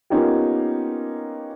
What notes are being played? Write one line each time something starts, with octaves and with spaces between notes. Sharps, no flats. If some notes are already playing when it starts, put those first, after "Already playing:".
A#3 B3 C#4 D#4 F4 G4